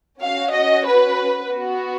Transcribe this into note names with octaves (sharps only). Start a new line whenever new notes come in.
C#4 F#4 F5
D#5
B4
B3 F#4